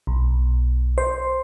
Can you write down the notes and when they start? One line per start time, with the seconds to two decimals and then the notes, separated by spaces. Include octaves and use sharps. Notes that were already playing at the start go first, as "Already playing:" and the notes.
0.07 B1
0.98 C5